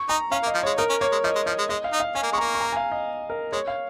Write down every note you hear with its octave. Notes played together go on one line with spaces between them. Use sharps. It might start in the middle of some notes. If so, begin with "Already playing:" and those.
Already playing: C#6
D#4 A#5
C#4 F5
A#3
D#5
F3
G#3 C#5
D#4 A#4
C#4
A#3 C#5
G#3
F3 D#5
G#3
F3 D#5
G#3
G#3 D#5
F5
D#4
F5
C#4 G#5
A#3
G#3 C#6
A#3 A#5
C#6
A#5
G#5
F5
D#5
A#4
G#3 C#5
F5